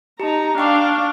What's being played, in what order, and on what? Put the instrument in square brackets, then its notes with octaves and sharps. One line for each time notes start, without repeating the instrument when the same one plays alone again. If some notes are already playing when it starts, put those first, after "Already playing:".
[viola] D#4 A#5 [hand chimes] G4 A5
[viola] D4 F5 [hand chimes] G5 C#6 D6